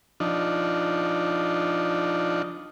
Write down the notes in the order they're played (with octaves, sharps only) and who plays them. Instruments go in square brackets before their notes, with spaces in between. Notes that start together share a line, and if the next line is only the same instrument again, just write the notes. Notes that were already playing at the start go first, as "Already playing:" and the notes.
[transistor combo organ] F3 D4 D#4